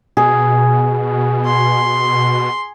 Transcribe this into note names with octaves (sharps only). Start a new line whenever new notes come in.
B2 G#4
C6